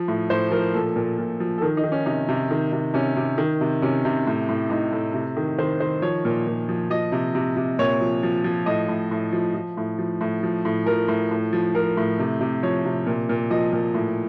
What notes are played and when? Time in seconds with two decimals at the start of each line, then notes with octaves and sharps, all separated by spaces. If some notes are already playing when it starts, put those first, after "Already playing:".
Already playing: F3
0.08 A2
0.30 A2 C5
0.51 F3 A#4
0.74 A#2 A4
0.96 A#2
1.19 A#2
1.40 F3
1.58 A4
1.62 D#3 A#4
1.77 D#4
1.84 D#3
1.92 C#4
2.06 C3 D#4
2.29 C3
2.51 D#3
2.72 C3
2.94 C3 C#4
3.16 C3
3.38 D#3
3.61 C3
3.82 C3 C#4
4.05 C3
4.27 A2
4.49 A2
4.70 A2 D#4
4.93 A2
5.14 C3
5.37 D#3
5.58 D#3 C5
5.80 D#3 C5
6.02 F3 C#5
6.25 A#2
6.47 A#2
6.69 F3
6.90 F3 D#5
7.12 C3
7.35 C3
7.57 C3
7.79 A#2 C#5
8.01 F3
8.23 F3
8.44 F3
8.66 A2 D#5
8.88 A2
9.11 A2
9.33 F3
9.54 F3
9.77 A2
9.99 F3
10.21 A2
10.43 F3
10.65 A2
10.86 F3 A#4
11.08 A2
11.31 A2
11.53 F3
11.75 F3 A#4
11.97 A2
12.19 C3
12.41 C3
12.63 F3 C#5
12.86 C3
13.06 A#2
13.29 A#2
13.50 F3 D#5
13.73 A#2
13.95 A2